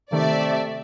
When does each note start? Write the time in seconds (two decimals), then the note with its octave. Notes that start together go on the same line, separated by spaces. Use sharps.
0.13 C3 D#3 A3 D5 E5